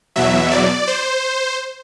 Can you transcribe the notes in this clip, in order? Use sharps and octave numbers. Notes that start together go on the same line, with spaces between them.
E2 B2 F#3 E5
D5
C5